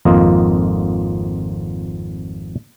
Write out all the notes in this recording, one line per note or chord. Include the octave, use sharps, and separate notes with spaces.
G#1 F2 A#3 F4 D#5